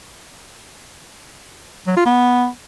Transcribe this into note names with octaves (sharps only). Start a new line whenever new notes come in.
F#3
F4
B3